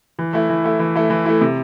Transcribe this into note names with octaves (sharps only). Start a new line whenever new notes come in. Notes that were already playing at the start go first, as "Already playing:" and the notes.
E3
A3 E4
E3
A3 E4
E3
A3 E4
E3
A3 E4
C3